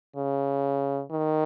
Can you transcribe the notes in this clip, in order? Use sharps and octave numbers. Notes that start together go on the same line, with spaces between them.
C#3
D#3